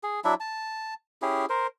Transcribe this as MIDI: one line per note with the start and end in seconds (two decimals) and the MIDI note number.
0.03 0.20 68
0.25 0.34 54
0.25 0.34 62
0.25 0.34 64
0.25 0.34 76
0.40 0.94 81
1.22 1.46 61
1.22 1.46 64
1.22 1.46 67
1.22 1.46 68
1.49 1.67 70
1.49 1.67 72